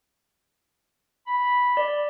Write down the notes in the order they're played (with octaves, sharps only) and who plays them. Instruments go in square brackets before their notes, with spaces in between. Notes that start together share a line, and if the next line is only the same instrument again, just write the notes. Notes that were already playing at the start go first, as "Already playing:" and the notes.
[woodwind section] B5
[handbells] D5